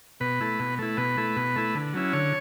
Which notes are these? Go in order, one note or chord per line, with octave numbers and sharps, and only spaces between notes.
B2 B4
A3 E4
B2
A3 E4
B2 B4
A3 E4
B2
A3 E4
D3
F#3 C#4 E4
D3 C#5